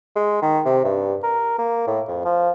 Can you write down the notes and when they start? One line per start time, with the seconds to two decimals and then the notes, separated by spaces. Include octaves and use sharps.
0.16 G#3
0.42 D#3
0.65 C3
0.85 G2
1.23 A#4
1.59 A#3
1.87 A2
2.08 F2
2.25 F3